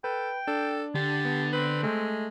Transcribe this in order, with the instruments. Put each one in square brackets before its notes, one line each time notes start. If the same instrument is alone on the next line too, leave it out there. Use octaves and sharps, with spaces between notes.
[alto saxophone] A4 [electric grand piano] B4 [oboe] G5
[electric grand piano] D4 [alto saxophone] A4
[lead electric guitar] D3 [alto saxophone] G4 [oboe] A5
[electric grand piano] B3
[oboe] C4 [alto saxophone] B4
[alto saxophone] G#3 [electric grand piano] A3